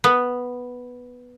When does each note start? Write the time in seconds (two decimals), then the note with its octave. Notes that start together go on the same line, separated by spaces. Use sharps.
0.04 B3